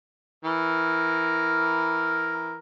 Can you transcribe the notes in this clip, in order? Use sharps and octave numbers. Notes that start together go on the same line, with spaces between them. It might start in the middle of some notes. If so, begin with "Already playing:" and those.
E3 A#4